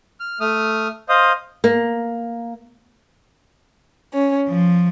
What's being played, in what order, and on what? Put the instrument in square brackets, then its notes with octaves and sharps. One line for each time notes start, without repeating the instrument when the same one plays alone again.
[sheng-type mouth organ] F6
A3 D#6 F6
C5 D#5 F5 D#6
[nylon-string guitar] A#3
[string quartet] C#4
F3